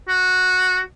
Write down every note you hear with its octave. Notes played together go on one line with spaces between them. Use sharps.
F#4